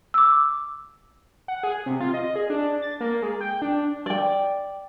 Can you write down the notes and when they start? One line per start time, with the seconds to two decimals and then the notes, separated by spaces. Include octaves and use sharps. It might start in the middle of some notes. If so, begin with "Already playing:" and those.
0.14 D6 E6
1.48 F#5
1.63 G#4
1.86 C3
2.00 F4
2.14 D#5
2.36 G#4
2.50 D4
2.82 A6
3.01 A#3
3.23 G#3
3.41 G5
3.62 D4
4.06 D5 G5